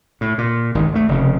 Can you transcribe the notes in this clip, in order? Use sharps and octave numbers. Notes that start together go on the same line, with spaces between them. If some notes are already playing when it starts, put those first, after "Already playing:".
A2
A#2
G#1 F#2 D#3
D2 F#3 A3
F1 C#3